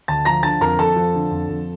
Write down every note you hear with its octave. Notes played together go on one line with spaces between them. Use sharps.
D2 A5 A6
F3 A#5 A#6
D3 A5 A6
F2 A#4 A#5
F2 A4 A5
F3
D3
F2
F2